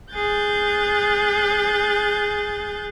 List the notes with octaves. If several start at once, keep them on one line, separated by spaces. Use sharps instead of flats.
G#4 F#6 G6 A6